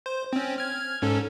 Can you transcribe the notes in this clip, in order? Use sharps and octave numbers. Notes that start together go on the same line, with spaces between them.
C5
C4 C#4
F6 G#6
G#2 C#4 A4